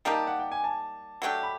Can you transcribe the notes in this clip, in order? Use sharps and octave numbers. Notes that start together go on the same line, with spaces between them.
G3 A#3 D#4 G4 A5
F#5
G5
G#5
A5
F#3 A3 D4 G4
B5